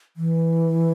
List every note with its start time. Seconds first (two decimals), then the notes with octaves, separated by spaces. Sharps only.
0.17 E3